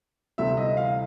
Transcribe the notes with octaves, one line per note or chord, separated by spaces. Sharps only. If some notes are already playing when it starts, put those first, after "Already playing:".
D2 C3 E3 G3 C4 E5
D#5
F5